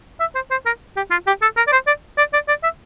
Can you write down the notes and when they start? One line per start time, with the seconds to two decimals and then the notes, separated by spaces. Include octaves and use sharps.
0.20 E5
0.35 C5
0.51 C5
0.66 A#4
0.96 G4
1.11 F4
1.27 G4
1.42 A4
1.57 A#4
1.67 D5
1.72 C5
1.87 D5
2.18 D5
2.33 D5
2.48 D5
2.63 E5